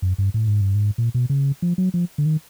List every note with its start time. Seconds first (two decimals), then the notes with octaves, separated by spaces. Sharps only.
0.02 F#2
0.18 G2
0.34 A2
0.48 G#2
0.61 G2
0.75 G#2
0.98 A#2
1.14 B2
1.30 C#3
1.62 F3
1.78 F#3
1.94 F3
2.18 D3
2.26 D#3